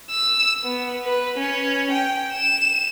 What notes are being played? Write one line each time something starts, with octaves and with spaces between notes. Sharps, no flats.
E6
B3
B4
C#4
G5
E7